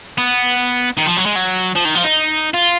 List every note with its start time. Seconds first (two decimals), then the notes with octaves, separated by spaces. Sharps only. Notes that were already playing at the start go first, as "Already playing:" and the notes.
0.18 B3
0.97 D#3
1.06 F3
1.17 F#3
1.26 G#3
1.35 F#3
1.76 F3
1.85 D#3
1.96 F3
2.04 D#4
2.54 F4